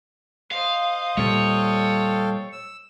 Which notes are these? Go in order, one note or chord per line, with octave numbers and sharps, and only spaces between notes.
C5 D#5 F5
A#2 G3 A4 C#5 F5 G5
E6